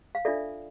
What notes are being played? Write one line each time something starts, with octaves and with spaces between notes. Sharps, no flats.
F5
D4 F4 A4 D5 E5